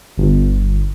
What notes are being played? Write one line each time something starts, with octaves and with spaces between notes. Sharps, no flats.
G1